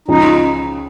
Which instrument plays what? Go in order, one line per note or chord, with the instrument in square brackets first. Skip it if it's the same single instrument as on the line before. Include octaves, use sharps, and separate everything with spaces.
[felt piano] C#2 C#3 F3 [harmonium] D#4